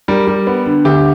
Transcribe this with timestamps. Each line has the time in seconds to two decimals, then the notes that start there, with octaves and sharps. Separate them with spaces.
0.08 G3 A#4
0.27 G3
0.47 B3
0.66 D3
0.85 D2 G4